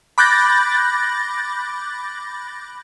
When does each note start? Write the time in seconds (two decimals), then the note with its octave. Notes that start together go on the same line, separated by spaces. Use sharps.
0.18 B5 D6 F#6 G6 A6 A#6